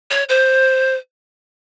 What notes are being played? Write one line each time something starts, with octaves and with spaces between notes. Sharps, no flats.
C#5
C5